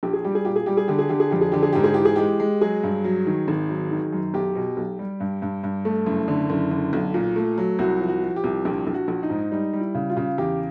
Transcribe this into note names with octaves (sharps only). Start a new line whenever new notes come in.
A#1 G4
G#4
G3 G4
G#4
A#2 G4
G#4
G3 G4
G#4
D3 G4
G#4
D3 G4
G#4
F2 G4
G#4
D3 G4
G#4
G#2 G4
G#4
E3 G4
G#4
G#3 G4
G#3
F#3 G#4
G2
F#3
D#3
G#1
F#3
D#3
F#2
B1 G4
B2
B1
G3
G2
G2
G2
A3
F#1
D3
F#1
D3
B1
A#2
A3
F#3
C2 F#4
F3
F#4
F3
G4
C2
A#1 G4
A#1
F#4
A#1
D#4
G#2
G3 D#4
G3
E4
C#3
F4
C#3
E2 G4